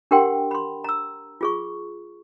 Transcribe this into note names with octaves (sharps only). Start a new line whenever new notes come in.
D4 G4 A#4 F#5 G5 C6
B5 C6
A#5 E6
F4 G#4 C#6